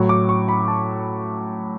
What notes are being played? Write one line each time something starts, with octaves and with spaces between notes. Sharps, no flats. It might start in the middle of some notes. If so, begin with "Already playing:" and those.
Already playing: A2 F#3 C#6
D6
C#6
B5
A5